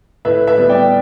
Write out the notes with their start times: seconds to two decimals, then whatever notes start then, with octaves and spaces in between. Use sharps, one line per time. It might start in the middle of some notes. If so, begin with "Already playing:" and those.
0.25 A2 B4 E5
0.47 B4 E5
0.58 G3 B3
0.69 D5 G5